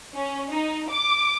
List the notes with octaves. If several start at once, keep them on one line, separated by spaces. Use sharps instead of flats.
C#4
D#4
D6